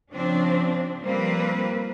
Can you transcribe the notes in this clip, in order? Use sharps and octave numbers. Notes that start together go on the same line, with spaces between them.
C#3 F3 C4 D4
F3 G3 A#3 C4 B4